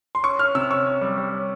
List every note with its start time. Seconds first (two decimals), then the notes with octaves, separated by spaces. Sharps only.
0.15 C6
0.23 C#4 C#6
0.39 C#4 F6
0.55 C3 E6
0.71 C#4 C#6
0.86 C#4
1.01 G3
1.17 G3
1.33 C#4